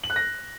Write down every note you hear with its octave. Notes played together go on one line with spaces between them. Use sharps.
F#7
F#6
A#6